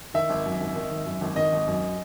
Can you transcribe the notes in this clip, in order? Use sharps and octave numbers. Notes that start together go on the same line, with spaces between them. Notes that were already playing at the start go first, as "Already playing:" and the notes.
D#3 E5
G#1
F#2
G#1
D#3
G#1
F#2
G#1
D#3 D#5
G#1
F#2